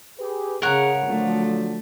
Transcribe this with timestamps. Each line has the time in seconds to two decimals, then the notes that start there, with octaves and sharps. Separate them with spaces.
0.19 G4 G#4 B4
0.62 C#3 G#4 A#4 C#5 F#5
1.06 D3 F3 F#3 A3